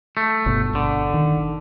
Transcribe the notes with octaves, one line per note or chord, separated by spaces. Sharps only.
A3
G1 B2
D3
D#3